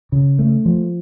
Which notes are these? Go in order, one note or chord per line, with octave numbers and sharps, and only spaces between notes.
C#3
A3
F3